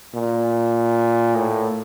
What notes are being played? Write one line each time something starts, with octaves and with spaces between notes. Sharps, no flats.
A#2
A2